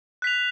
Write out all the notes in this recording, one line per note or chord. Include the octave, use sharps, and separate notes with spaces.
F#6 B6 F7